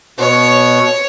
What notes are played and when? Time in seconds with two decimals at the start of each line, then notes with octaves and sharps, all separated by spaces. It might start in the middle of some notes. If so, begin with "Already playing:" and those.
0.19 B2 C#5